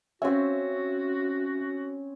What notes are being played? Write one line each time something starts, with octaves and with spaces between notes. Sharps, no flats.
C4 C#4 F#4 E5